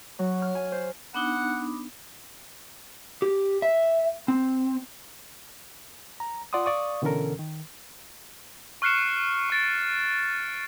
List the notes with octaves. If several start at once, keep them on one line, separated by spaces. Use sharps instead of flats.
F#3
F6
G#5
C5
B3 D4 D#4 F#5
G4
E5
C4
A#5
F4 D5 F#5 C6 D#6
D5 F5 C#6 D#6
B2 D3 E3 C#4 A4 A#4
D#3
C#6 F6 F#6 C7 C#7 E7
C#6 A6 D7